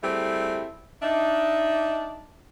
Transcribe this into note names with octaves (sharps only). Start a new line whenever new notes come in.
G3 A3 C4 E4 G4 G#4
D4 D#4 E5